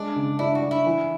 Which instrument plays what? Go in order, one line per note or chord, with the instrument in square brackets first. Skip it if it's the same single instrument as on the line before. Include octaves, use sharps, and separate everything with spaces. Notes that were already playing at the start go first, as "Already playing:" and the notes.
Already playing: [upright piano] G#3 [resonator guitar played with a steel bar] D4
[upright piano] C#3
[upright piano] D4 [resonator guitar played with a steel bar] E4
[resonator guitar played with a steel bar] F#4
[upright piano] D4
[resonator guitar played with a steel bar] E4
[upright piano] E3